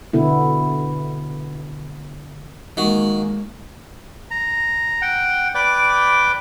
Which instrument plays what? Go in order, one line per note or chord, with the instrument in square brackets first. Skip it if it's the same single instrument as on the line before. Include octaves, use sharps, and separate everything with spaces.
[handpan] B2 D3 B3 E4
[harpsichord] D#3 F#4 [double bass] G#3 A#3
[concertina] A#5
F#5 G5
B4 D5 G5 D6